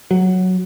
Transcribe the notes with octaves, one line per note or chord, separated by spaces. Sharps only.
F#3